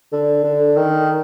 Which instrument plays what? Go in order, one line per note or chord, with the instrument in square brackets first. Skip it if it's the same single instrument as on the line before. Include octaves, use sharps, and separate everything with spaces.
[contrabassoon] D3
D3
D#3